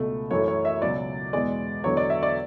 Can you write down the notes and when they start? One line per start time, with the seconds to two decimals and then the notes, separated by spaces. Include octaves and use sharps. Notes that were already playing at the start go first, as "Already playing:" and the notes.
Already playing: C#2 B2 A3
0.31 F#2 E3 A3 C#5
0.48 C#5
0.65 E5
0.82 C#2 B2 F#3 D5
1.33 E2 B2 G#3 D5
1.84 E2 D3 F#3 C#5
1.97 D5
2.10 E5
2.23 D5